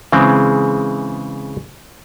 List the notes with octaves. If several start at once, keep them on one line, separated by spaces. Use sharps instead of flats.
C#3 E3 G#3 C4